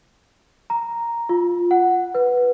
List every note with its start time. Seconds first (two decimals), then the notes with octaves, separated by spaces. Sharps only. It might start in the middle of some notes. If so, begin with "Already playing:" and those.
0.70 A#5
1.29 F4
1.71 F#5
2.15 B4